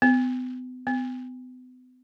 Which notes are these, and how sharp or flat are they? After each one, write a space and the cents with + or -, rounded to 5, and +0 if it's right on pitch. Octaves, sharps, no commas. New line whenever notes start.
B3 +40
B3 +40